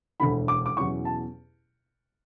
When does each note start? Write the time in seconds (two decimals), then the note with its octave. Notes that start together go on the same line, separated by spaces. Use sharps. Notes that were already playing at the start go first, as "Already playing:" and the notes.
0.20 E1 D2 D3 B5
0.48 D6
0.66 D6
0.76 E2 B2 F#3 C#4 E4 C#6
1.05 A5